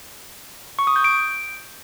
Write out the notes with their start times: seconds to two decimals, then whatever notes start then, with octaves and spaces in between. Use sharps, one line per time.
0.79 C#6
0.87 D#6
0.96 G6
1.04 D7